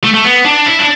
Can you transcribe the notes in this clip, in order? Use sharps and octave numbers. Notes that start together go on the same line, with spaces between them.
A3
A3
B3
D4
E4
D4